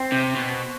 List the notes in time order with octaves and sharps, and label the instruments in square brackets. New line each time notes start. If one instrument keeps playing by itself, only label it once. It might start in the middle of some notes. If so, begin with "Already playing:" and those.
Already playing: [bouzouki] C4
[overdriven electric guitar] C3
B2